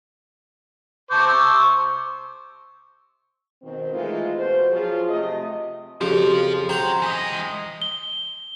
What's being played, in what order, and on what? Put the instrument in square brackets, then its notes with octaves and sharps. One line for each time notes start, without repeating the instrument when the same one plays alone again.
[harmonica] C5 D6 [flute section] A5 C#6 G6
[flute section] C#6 E6
[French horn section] B2 D#3 C4
E3 G#3 A3 D#4 F4
B2 C5
F3 F#3 F4 G#4
C3 A3 G4 D#5
[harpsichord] F2 C#3 [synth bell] F#4 G4 [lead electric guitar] C5 F5
[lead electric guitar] F#3 [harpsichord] C5 F#5 [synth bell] G5 G6 F7
[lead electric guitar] E3 D#5
[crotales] G7